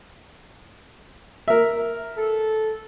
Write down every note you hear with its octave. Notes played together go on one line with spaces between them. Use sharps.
A#4 E5
A4